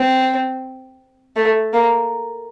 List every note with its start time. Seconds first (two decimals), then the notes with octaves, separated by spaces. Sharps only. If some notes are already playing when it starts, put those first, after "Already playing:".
Already playing: C4
1.36 A3
1.73 A#3